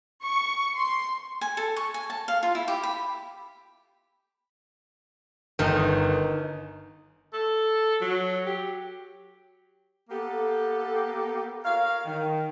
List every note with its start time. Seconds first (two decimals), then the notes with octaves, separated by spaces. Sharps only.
0.24 C#6
0.76 C6
1.41 G#5
1.57 A4
1.76 C#6
1.94 G#5
2.10 A5
2.28 F5
2.43 F4
2.55 E4
2.68 G4
2.83 B5
5.59 G1 D#3 D#4
7.33 A4
8.01 F#3
8.46 G4
10.09 A#3 B3 G4 A4
11.64 A#4 C#5 F5
12.05 D#3